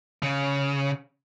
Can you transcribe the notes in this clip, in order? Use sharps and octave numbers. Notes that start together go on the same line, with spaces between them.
C#3